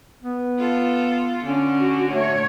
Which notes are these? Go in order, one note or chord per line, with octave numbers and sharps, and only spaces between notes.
B3
F4 A4
D3 C#4
F#4
A3 C#5